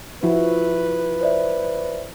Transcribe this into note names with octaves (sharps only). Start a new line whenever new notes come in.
F3 E4 F#4 B4
C5 D5 E5